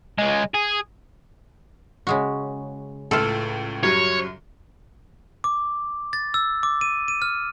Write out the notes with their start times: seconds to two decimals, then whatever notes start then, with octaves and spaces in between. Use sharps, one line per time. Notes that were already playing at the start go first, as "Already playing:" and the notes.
0.19 C#2 G#3
0.54 G#4
2.07 C#3 G#3 F#4
3.11 C#2 A2 F4 A4
3.83 F#2 F#3 G3 C#5
5.44 D6
6.13 A6
6.34 E6
6.63 D6
6.81 D#7
7.08 D#7
7.22 F6